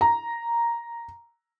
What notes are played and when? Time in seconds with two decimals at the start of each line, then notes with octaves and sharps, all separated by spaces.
0.01 A#5